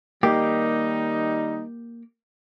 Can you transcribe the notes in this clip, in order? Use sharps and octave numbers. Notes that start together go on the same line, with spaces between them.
D#3 G3 A#3 D#4 G4